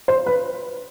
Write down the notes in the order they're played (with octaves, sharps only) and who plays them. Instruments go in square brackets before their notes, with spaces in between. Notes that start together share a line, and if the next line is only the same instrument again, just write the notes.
[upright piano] C5
B4